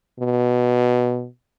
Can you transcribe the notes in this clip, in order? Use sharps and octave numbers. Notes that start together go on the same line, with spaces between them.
B2